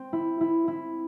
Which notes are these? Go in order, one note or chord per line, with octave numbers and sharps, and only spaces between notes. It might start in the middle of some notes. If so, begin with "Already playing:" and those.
Already playing: C4
E4
E4
E4